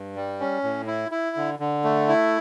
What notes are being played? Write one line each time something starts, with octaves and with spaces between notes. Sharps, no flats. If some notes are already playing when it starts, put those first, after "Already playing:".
Already playing: G2
G3
C#4
A2
E4
E4
D3
D3
A3
E4